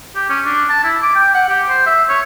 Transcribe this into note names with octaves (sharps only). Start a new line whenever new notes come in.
G4
C#4
D4
A5
E4
D6
G5
F#5
G4
C5
E5
C#5